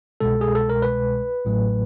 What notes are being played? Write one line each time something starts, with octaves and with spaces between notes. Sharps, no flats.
C2 B2 G#3 A4
G#4
A4
A#4
B4
A1 A2 F#3 A3